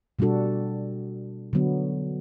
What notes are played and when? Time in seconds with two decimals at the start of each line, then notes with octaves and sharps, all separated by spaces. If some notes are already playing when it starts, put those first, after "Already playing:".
0.19 B2 G3 D4 F#4 A4
1.53 D3 F#3 B3